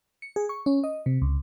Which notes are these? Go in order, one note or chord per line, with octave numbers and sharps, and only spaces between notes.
C#7
G#4
C#6
C#4
D#5
C3
C#2